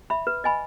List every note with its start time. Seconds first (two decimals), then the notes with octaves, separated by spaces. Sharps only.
0.10 E5 B5
0.27 B4
0.44 D#5 G#5 B5